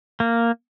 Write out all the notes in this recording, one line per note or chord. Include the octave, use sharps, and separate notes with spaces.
A#3